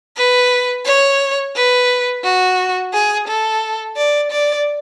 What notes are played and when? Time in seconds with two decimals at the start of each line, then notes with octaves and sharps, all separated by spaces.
0.17 B4
0.86 C#5
1.56 B4
2.24 F#4
2.93 G#4
3.28 A4
3.96 D5
4.31 D5